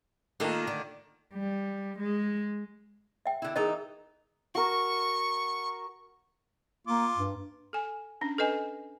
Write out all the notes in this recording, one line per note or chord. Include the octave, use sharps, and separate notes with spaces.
D#3 A#3 D4 F4 A4
D3
G3
G#3
E5 G5
D3 E4
E3 D#4 G#4 A#4 D#5
F#4 A#4 C#6
A#3 F4 D6
G2
A4 G#5
C#4 D4
A4 B4 D#5 G#5